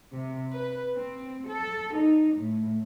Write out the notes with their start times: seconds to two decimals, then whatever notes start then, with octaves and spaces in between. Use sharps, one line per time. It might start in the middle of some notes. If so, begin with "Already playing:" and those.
0.12 C3
0.52 B4
0.96 C4
1.49 A4
1.96 D#4
2.35 A2